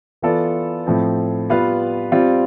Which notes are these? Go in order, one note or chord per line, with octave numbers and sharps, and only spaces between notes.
E3 B3 F4 A4 D5
A2 F3 C4
G3 B3 F4 B4 F5
G3 C4 F4